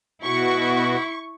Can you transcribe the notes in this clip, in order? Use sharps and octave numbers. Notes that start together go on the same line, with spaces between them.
B2 E4 F#4 C#6